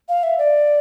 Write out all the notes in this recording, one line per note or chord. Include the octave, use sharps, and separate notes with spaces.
F5
E5
D5